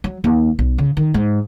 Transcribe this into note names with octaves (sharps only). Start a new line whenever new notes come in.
F#3
D#2
B1
C#3
D#3
G#2